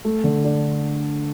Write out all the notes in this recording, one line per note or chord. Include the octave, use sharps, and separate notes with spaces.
A3
D3
D4